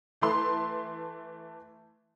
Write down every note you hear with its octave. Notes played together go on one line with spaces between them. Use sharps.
E3 A3 C6